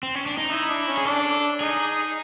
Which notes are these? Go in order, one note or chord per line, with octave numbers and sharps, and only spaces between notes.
C4
C#4
D4
D#4
D#4 E4
D4
C#4
G#4
D4 A4
D#4 G#4